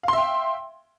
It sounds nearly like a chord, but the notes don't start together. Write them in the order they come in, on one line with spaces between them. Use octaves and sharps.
F5 C6 E5 G5